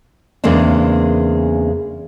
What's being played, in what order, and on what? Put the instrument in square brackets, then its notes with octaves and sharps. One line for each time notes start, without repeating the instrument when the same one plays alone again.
[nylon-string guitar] E2 C#3 G#3 A#3 C4 D4